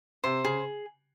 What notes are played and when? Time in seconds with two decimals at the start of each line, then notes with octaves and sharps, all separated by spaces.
0.24 C3 C5
0.45 C#3 G#4